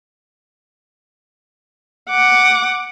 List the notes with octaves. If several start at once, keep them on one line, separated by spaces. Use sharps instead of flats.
F#5 D6